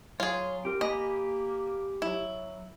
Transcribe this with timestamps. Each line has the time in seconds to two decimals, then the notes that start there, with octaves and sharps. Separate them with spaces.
0.20 F#3 F4 G#4 C#5 C6
0.65 C4 G4 A#4
0.81 A#3 G4 D#5 G#5 B5
2.02 F#3 E4